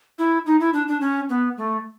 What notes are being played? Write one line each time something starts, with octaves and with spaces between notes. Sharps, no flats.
E4
D#4
E4
D4
D4
C#4
B3
A3